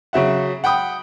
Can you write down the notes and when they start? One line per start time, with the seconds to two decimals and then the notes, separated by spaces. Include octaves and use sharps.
0.13 C#3 F#3 E5 F#5
0.64 F#5 G5 B5 D#6